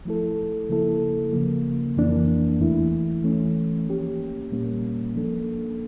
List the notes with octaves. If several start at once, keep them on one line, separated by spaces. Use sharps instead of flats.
F3 A3 E4 A4
C#3 F3 A#3 E4 A4
C#3 F3 A#3
F2 E3 A#3 D4
E2 E3 A3 E4
E3 A3 C#4
F3 A#3 C#4 G4
A#2 G3 A#3 C#4
F3 A#3 D4 A4